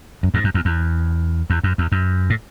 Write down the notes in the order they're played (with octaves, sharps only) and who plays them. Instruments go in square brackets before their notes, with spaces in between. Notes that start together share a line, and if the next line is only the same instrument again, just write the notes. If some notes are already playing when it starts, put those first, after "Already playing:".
[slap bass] F#2
E2 G#2
F#2
E2
E2
E2
F#2
E2
F#2
A2